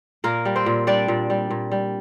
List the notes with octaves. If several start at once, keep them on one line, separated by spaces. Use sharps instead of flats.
A#2 A#3 A#4
G3
C4 C5
A#2
G3 D4 D5
A#2
G3
A#2
G3